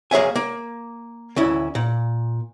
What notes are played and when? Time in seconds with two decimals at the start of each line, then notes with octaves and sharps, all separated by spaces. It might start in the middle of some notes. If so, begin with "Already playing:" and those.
0.11 A#3 G#4 C#5 E5 G#5
0.36 A#3
1.36 D2 C#4 E4
1.75 A#2